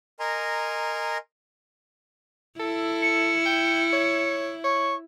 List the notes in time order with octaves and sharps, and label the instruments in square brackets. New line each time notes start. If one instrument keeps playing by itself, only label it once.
[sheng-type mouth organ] A#4 D#5 G#5 A#5 C6
[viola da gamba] E4 [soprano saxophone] A4
[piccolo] C#7
[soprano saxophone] G5
C#5
[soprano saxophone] C#5 [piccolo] C#6